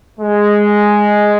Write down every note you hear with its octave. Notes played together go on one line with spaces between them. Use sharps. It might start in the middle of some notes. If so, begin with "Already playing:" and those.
G#3